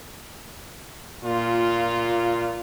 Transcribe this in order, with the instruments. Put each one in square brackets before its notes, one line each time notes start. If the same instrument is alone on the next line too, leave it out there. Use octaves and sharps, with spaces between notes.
[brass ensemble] A#2 F4